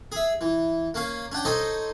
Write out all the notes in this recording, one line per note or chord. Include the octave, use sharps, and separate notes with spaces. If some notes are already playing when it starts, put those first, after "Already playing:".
G#4 E5
E3
A#3 C#4 F5
C#4 D4 F#5 G5
D#4 A4 C5 C#5 D#5